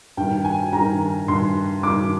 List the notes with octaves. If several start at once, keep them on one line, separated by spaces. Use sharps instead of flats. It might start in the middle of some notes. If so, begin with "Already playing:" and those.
G2 D#3 G5
G#5
G2 D#3 A#5
G2 D#3 C6
G2 D#3 D6